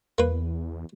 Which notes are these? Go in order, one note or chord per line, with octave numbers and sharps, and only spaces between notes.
E2 A#3 B4